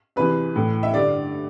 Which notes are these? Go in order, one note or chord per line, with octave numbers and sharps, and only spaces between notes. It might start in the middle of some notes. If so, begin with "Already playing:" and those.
E2 C3 E3 B4
A2 E3
E5
G2 D3 D5